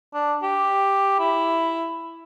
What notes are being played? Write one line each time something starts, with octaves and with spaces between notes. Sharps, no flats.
D4
G4
E4